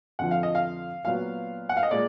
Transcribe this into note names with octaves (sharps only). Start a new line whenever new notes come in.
F2 D3 F3 F#5
F5
D#5
F5
A#2 F#3 B3 F5
F#5
F5
D#5
A#2 G#3 D5